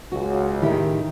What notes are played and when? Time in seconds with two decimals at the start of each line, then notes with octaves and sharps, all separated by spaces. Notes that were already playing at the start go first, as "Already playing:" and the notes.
0.12 C#2 F#4
0.62 A2 D#3 E4 G4 E5